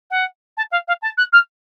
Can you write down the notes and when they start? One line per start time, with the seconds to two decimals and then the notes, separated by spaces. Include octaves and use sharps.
0.10 F#5
0.57 A5
0.71 F5
0.87 F5
1.02 A5
1.17 F#6
1.33 F6